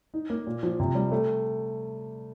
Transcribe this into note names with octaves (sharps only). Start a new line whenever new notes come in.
D#4
A#3
A#2
F3
C3
G3
A3